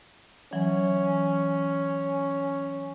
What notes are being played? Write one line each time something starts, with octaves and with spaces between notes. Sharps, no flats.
E3 F#3 C#4